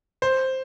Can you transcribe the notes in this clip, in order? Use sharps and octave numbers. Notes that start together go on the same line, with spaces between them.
C5